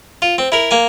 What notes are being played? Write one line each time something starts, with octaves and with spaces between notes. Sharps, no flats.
F4
C4
E4 A#4
A#3 G#5